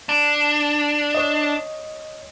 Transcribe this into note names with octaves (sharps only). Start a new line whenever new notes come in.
D4
C#5 D#5